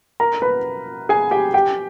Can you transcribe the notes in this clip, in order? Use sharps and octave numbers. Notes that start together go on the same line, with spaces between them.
A#4 A#5
B4 B5
G#4 G#5
G4 G5
G4 G5